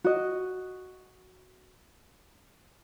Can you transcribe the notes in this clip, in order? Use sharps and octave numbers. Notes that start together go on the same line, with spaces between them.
F#4 D#5